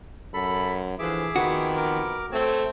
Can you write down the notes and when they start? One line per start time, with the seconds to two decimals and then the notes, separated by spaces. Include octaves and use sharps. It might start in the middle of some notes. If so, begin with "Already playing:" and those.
0.34 F#2 A4 B5
0.99 D3 E3 F3 G#4 E5 D6
1.36 F2 D#3 B3 F#4
1.76 A#4 D6
2.31 A3 C4 C#5